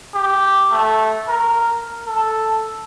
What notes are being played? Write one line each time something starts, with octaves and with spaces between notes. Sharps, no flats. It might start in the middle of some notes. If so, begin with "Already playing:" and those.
G4
A3
A#4
A4